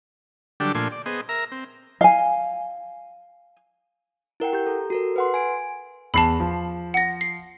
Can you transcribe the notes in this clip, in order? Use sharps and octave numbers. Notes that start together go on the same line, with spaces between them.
D3 F#3 G3 D4 G4 A4
A#2 F3 A3 D4 G#5 C6
D5
B3 G#4 C5 D#5
A#4 E5 A#5
C4
F5 G#5
E4 A#4 F#5 G5
G4 G6
A4 A#5
F#4 A4 A#4
B4 F#5 C6
G#5 D7
E2 A5 B5 C7
F3
F#5 A#6
C7